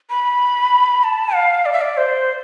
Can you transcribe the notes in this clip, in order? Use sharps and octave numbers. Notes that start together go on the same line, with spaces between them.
B5
A5
F5
D5
E5
D5
C5